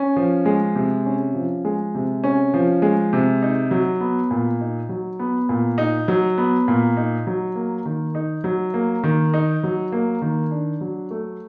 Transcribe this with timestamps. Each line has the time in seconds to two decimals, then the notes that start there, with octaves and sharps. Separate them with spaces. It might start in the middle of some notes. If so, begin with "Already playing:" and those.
Already playing: C#4
0.16 F3
0.46 G#3
0.75 C3
1.05 C#4
1.35 F3
1.65 G#3
1.95 C3
2.24 C#4
2.54 F3
2.82 G#3
3.13 C3
3.42 D#4
3.71 F#3
4.00 B3
4.31 A#2
4.61 D#4
4.89 F#3
5.19 B3
5.49 A#2
5.78 D#4
6.08 F#3
6.38 B3
6.68 A#2
6.97 D#4
7.27 F#3
7.55 A#3
7.86 D#3
8.15 D#4
8.44 F#3
8.74 A#3
9.04 D#3
9.34 D#4
9.63 F#3
9.92 A#3
10.22 D#3
10.51 D4
10.81 F#3
11.11 A3